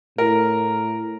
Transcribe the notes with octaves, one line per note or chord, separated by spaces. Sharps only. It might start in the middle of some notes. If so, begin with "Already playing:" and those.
A2 A#4